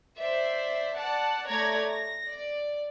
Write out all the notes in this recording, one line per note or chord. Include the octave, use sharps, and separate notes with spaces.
C5 D5 E5
D5 F#5 A5
A3 C#5 D5 A#5 G#6 A#6
A#6
D5